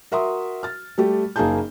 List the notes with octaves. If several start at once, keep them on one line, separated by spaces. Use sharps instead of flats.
F#4 A#4 E5 C6 D#6
F6 A6
G3 A3 G4
F#1 A#3 D#4 G#4 A5 G6